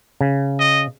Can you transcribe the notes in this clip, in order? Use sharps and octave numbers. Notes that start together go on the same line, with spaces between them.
C#3
D#5